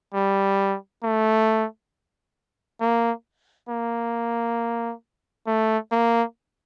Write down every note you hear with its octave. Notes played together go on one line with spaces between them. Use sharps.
G3
A3
A#3
A#3
A3
A#3